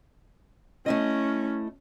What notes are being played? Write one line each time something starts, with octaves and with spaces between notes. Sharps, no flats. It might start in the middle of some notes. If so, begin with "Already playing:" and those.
A3 C#4 E4 D#5